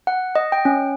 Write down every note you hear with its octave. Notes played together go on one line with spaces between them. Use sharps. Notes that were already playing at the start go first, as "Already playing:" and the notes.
F#5
D#5
G5
C#4